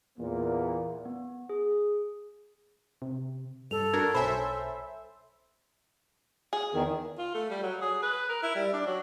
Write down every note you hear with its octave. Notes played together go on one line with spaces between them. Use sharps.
E2 A#2 A#3
B3
G#4
C3
G2 A4 F7
D4 F#4 A#4 G#6
B1 C5 C#5 E5 G#5 B5
G#4
E2 D#3
F4
A3
G3
F#3
G#4
B4
A#4
E4
G3
D4
F#3